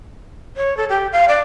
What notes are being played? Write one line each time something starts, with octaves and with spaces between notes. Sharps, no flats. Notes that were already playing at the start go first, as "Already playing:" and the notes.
C#5
A4
G4
F5
D5